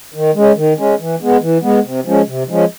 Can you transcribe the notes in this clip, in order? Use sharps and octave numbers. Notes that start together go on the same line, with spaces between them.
D#3
G#3 C#4
D#3
G#3 C#4
E3
G#3 B3
E3
G#3 B3
C3
F3 G#3 C#4
C3
F3 G#3 C#4